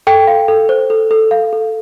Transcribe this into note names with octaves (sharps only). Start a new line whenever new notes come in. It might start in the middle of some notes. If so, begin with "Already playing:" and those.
A4 G5
F5
A4
C5
A4
A4
F5
A4